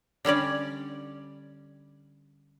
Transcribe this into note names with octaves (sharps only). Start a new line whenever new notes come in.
D3 G3 C#4 D5